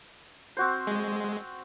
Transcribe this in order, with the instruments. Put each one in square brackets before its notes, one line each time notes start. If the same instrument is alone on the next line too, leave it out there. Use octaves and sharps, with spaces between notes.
[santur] C4 F#4 C5
[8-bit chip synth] G#3